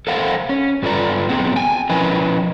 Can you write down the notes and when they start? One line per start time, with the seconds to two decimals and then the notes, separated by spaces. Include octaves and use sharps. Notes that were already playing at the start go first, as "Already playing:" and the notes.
0.07 A4 A#4 C5 F5 F#5
0.49 C#4
0.83 G2 F4 A4 B4 D5 A#5
1.29 F#3 B3 C4 G#4
1.56 G5 G#5
1.90 F3 C#4 E4 A#4 B4 D#5